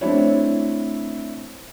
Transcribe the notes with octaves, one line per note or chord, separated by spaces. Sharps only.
A3 C4 D4 E4 C#5